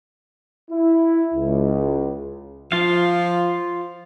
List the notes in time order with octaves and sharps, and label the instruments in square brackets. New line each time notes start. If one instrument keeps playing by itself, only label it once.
[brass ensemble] E4
C#2
[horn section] F3 [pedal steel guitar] F4 F5